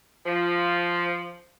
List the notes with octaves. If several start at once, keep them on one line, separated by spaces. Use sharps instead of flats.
F3